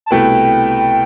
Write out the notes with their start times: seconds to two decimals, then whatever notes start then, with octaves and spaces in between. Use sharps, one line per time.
0.06 A5
0.11 C2 B2 A3 E4 B4 G5